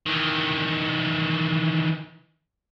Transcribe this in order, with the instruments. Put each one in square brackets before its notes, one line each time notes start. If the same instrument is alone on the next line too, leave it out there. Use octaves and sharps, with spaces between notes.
[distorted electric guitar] D#3 E3